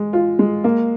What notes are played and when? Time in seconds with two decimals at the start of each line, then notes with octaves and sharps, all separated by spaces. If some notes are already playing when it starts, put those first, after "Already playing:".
Already playing: G#3
0.13 F4
0.39 G#3
0.64 A#3